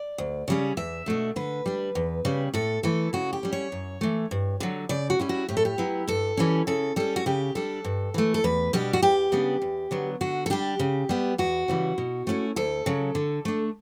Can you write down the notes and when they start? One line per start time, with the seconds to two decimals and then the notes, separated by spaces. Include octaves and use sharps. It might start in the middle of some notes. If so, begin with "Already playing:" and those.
Already playing: D5
0.18 D2
0.48 C#3 G3 C#4
0.77 E2 E5
1.06 B2 A3 D4
1.36 D3 B4
1.66 G3 D4
1.95 E2
2.25 C#3 G3
2.54 A2 A4
2.83 E3 A3 A4
3.13 C#3 F#4
3.33 G4
3.43 G3 C#4
3.53 C#5
3.72 F#2
4.01 E3 A3
4.31 G2
4.60 D3 F#3
4.89 C#3 D5
5.10 F#4
5.19 G3 C#4 E4
5.29 F#4
5.49 A2 G4
5.57 A4
5.65 G4
5.78 F#3 B3 E4
6.07 G2 A4
6.37 E3 G3 C#4
6.67 C#3 A4
6.96 G3 C#4 A4
7.16 F#4
7.26 C#3 G4
7.55 G3 D4 A4
7.84 G2
8.14 E3 A3
8.34 A4
8.44 E2 B4
8.73 B2 G3 D4 G4
8.93 F#4
9.02 E2 G4
9.32 C#3 G3 B3 D4
9.62 E2
9.91 D3 F#3 B3
10.21 D3 F#4
10.46 A4
10.50 G3 D4 G4
10.79 C#3
11.09 G3 B3
11.38 E2 F#4
11.68 C#3 E3 G3
11.98 B2
12.27 A3 C#4 E4
12.56 D2 A4
12.86 C#3 F#3
13.15 D3
13.45 A3 D4